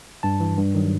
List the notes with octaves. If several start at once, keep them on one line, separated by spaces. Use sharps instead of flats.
G2 A5
E3
G2
D#3 F#3